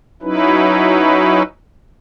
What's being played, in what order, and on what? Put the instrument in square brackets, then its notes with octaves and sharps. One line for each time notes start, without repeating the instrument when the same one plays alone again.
[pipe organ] F#3 C#4 D#4 E4 B4